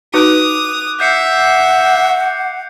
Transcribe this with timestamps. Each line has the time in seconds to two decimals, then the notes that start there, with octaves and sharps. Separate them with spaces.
0.14 D#4 F#4 B4 D6 D#6 F#6 D7
1.00 E5 F#5 G6 C7 C#7